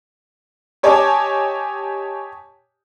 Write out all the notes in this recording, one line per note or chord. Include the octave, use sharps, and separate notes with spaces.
G4 C#5 D#5 G#5 A5 D6